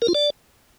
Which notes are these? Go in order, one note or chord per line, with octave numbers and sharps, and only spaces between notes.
A#4
F4
D5